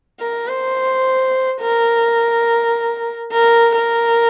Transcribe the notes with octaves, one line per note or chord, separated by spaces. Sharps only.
A#4
C5
A#4
A#4
A#4